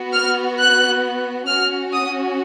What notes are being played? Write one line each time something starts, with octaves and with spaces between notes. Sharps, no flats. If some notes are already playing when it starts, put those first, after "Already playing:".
Already playing: B3 F#4
F6
F#6
C#4 F#4 F6
D#6